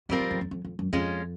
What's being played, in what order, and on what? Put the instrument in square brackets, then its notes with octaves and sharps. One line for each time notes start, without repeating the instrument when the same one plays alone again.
[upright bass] F#2 [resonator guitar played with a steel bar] G3 C4 F4 A#4
[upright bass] F#2
F2
F2
F2
F2
F#2
[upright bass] F2 [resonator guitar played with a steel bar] G#3 C#4 F4